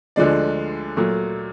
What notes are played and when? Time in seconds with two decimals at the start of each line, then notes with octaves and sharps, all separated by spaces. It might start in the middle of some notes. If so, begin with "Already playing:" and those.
0.16 D2 D3 F3 G#3 D5
0.96 A#2 F#3 A3